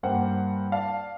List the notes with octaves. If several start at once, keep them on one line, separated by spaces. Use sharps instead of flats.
G2 A#3 C5 F#5 G5
D5 F5 A5